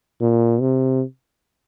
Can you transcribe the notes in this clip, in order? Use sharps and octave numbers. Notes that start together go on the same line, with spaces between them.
A#2
C3